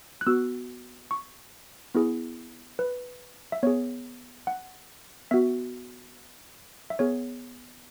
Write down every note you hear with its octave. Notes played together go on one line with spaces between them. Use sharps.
F#6
B3 F#4 E6
C#6
B3 E4 G#4
B4
E5
B3 G#4 C#5
F#5
B3 F#4 E5
E5
B3 G#4 C#5